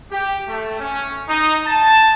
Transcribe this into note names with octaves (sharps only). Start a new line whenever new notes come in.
G4
A3
C#4
D#4
A5